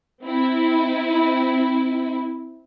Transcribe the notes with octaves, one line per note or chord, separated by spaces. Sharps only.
C4 E4